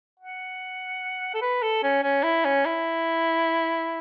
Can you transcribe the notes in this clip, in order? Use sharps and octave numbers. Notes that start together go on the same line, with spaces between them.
F#5
A4
B4
A4
C#4
C#4
E4
C#4
E4